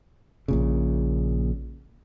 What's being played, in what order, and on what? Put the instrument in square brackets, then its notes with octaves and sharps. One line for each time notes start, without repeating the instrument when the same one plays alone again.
[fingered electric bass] A#1 A#2 C#3